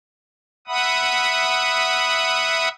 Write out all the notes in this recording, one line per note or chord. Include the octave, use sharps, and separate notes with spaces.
E5 F#5 B5 D#6